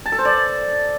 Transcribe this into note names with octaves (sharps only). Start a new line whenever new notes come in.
A5
A4
C5
D5